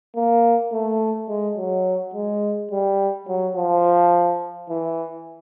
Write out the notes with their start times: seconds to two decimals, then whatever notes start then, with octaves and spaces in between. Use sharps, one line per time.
0.16 A#3
0.73 A3
1.29 G#3
1.57 F#3
2.14 G#3
2.72 G3
3.28 F#3
3.56 F3
4.69 E3